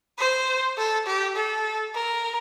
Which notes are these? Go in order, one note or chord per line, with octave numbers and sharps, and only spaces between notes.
C5
A4
G4
A4
A#4